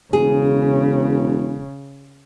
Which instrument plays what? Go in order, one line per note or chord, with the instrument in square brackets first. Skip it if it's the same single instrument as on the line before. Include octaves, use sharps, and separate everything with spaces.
[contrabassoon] E1 [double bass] C#3 [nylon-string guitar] G#4